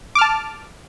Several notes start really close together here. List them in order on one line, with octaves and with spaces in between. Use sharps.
D6 F6 A5